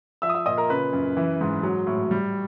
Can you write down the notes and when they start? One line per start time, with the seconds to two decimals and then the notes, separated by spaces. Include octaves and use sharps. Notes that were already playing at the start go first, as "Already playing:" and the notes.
0.22 F3 E5 E6
0.29 D#6
0.34 E5 E6
0.46 A#2 D#5 D#6
0.57 A#4 A#5
0.69 C#3 B4 B5
0.93 F#2
1.17 E3
1.41 G#2
1.63 F#3
1.87 A2
2.11 G3